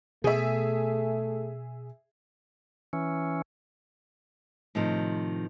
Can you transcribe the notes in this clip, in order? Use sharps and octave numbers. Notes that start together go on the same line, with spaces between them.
B2 A3 G#4 E5
E3 C#4
A2 C3 D#3 F3